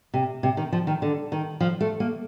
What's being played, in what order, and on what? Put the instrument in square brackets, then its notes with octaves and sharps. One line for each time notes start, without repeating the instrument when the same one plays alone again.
[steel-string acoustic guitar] C3
C3
D#3
F3
D#3
D3
D#3
F3
A3
A#3